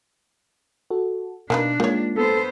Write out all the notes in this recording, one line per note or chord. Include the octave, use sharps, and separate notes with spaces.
F#4 A4
B2 A#3 D4 D#4 B4 F5 F#6
D#3 G#3 A#3 F4 C#5
B3 A4 C5